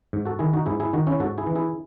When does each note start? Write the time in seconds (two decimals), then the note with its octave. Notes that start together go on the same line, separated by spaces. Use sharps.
0.13 G#2
0.25 F#4 A4
0.39 D#3 E4 G#4
0.53 D#4 F#4
0.66 G#2 E4 G#4
0.80 E4 G#4
0.93 D#3 D#4 F#4
1.07 C#4 E4
1.20 G#2 F#4 A4
1.38 E4 G#4
1.47 E3
1.55 E4 G#4